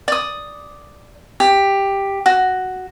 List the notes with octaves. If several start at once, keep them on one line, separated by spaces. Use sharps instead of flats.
D5 D#6
G4
F#4